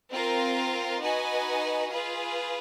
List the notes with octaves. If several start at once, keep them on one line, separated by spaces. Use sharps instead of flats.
C4 F4 A#4
D#4 F#4 B4 D#5 G#5
F4 G#4 B4